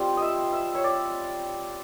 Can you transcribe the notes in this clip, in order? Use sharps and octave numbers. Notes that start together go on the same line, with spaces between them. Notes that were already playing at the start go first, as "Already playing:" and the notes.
Already playing: G3 C4 F4
D#5 E5
E5
C#5
D5